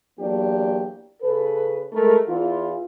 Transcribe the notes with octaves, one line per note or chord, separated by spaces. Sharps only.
E2 F#3 A#3 D4 G4
C#3 A4 B4
G#3 A3 A#4
E2 E3 F4